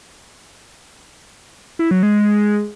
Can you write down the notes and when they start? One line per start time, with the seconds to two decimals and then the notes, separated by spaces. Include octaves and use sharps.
1.79 E4
1.91 F#3
2.03 G#3